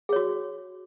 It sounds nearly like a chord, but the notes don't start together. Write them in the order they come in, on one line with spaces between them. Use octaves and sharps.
G#4 C#5 F#4